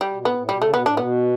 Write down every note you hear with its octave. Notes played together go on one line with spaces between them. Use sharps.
G3
B2
A2 B3
A2
B2 G3
C#3 A3
B2 B3
A2 D4
B2 B3